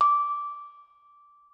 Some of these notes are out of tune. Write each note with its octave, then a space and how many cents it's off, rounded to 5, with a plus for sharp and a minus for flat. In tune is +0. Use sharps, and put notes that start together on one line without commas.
D6 -10